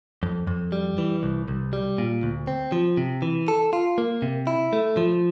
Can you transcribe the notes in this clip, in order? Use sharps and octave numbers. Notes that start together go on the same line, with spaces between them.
F2
F2
G3
E3
C2
C2
G3
A#2
D2
C4
F3
C3
E3
A4
F4
A#3
C3
E4
A3
F3